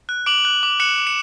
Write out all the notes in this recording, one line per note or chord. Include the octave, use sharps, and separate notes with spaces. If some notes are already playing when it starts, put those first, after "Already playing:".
F#6
D6 D7 F#7
F#6
D6
F#6 C#7 E7
D6
C#7 E7